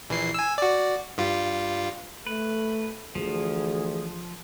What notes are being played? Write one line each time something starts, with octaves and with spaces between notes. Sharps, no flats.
A#1 E3 C7
G#5 E6
F#4 D5
G2 G3 F4
A3 B4
D2 E3 F3 G#4